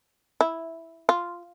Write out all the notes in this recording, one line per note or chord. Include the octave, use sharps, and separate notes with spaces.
E4
F4